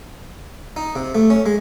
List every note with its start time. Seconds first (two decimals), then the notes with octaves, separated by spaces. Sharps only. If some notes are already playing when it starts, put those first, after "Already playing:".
0.76 D#4
0.95 C3
1.15 A3
1.30 C#4
1.46 G#3